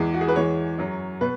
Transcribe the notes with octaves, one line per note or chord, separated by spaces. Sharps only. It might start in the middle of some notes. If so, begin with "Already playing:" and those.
Already playing: E2 E3 G#3
F#4
G#4
B4
E2 E3 G#3 C#5
F#2 F#3
B2 B4